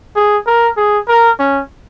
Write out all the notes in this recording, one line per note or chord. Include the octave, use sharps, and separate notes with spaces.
G#4
A#4
G#4
A#4
C#4